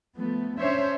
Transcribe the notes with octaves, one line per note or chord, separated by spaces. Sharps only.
F3 A3 B3
C#4 D4 C5 C#5 E5